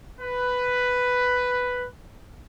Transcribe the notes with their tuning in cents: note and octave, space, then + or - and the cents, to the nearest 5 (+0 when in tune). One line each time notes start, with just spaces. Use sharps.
B4 +5